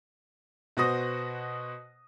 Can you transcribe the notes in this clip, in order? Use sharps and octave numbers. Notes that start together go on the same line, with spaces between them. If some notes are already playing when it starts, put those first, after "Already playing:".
B2 B3 F#4 C5 D#6 A#6